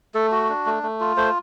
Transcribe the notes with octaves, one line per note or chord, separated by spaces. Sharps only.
A3 A4
F#4
D4
A3
A3
F4
A3 C5